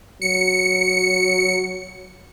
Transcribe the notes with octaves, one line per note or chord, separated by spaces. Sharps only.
F#3 C#7